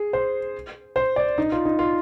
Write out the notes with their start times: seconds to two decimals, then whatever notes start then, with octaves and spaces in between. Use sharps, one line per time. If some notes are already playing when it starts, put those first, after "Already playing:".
Already playing: G#4
0.13 C5
0.96 C5
1.16 D5
1.38 D#4
1.52 F4
1.65 D#4
1.79 F4